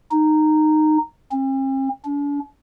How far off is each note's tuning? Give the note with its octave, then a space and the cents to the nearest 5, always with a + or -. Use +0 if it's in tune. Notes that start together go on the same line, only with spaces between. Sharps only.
D#4 -15
C4 +45
D4 -45